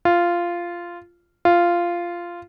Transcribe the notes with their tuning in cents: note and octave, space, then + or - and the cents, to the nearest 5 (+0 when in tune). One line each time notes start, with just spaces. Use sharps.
F4 -10
F4 -10